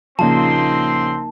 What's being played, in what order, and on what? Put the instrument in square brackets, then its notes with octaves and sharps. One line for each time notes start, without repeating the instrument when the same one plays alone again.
[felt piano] A#1 C#3 F3 [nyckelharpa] A#3 D#4 [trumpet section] C4 C6 [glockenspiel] A5